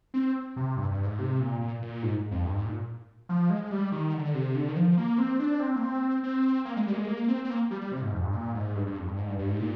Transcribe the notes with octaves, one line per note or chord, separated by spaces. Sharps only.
C4
C3
G2
G2
G#2
C3
A#2
A#2
A#2
G#2
F2
G2
G#2
A#2
F3
G#3
G3
D#3
D3
C3
D3
D#3
F3
A#3
C4
D4
C4
A#3
C4
C4
A#3
G#3
G3
A#3
G#3
A#3
C4
C4
A#3
G3
G3
C3
G#2
F2
G2
A#2
G#2
G2
G2
F2
G2
G#2
G2
G2
G#2
A#2